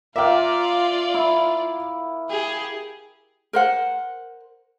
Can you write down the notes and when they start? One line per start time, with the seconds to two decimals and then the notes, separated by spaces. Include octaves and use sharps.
0.16 A#3 F4 A#4 D5 E5 G5
1.14 E4
2.30 G4 G#4
3.53 A#4 C5 F#5